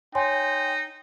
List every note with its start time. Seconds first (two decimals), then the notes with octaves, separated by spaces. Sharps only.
0.15 D#4 C#5 G5 G#5 C6